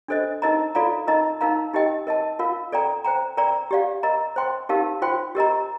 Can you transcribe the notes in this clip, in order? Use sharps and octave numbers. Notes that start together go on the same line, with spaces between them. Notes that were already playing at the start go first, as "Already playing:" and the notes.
D4 A4 C5 D#5
D#4 A#4 D#5 A#5
F4 A4 D5 F5 A#5
D#4 A#4 D#5 A#5
D#4 A#4 F5 A#5
D#4 G4 A#4 D#5 G5
A#4 D#5 A5
F4 A#4 F5
A4 D5 G5 A#5
C5 G5 A#5
A#4 D5 G5 A#5
G4 D5 F5
A#4 D#5 A#5
C5 G5 C6
D#4 G4 A#4 F5 A5
F4 C5 G5 C6
G4 A#4 D#5 A#5